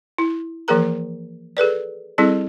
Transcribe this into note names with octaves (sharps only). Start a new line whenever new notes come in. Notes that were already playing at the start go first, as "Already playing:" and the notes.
E4
E3 F3 A#3 G#4 A#4 A#5
G#4 A4 B4 D5
G3 C4 E4 G#4 A4